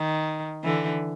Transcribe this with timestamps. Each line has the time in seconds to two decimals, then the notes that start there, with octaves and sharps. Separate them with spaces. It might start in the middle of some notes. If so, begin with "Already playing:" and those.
Already playing: D#3
0.64 D3 E3